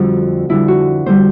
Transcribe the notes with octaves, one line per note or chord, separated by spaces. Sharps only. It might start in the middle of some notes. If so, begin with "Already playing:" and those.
Already playing: F2 D3 G3 F#4
F2 D3 G3 E4
F#4
F2 D3 G3 C5